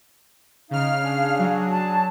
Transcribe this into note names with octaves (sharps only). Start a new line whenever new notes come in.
C#3 D#4 F5 F6
D4 G#4
F#3
A5